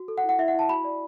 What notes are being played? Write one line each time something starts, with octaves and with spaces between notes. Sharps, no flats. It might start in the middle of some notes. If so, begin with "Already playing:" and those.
Already playing: F#4
A4
F#5
E4
F#5
E4 E5
F#5
E4 A5
F#4 B5
D5